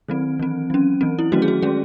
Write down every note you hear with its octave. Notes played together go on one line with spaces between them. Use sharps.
D#3 F#3 C4
E3 C4
F#3 C#4
E3 C4
E4
D#3 F#3 A3 C#4 F#4
G#4
F#4
D#3 G#3 C#4 G#4